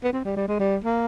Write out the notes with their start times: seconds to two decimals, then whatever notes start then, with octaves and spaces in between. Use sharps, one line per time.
0.04 B3
0.13 C4
0.25 G3
0.36 G3
0.48 G#3
0.60 G3
0.84 A#3